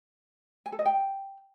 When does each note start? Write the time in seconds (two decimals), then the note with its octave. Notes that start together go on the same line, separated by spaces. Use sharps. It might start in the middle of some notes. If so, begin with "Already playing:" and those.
0.66 G#5
0.72 A4
0.79 D#5
0.86 G5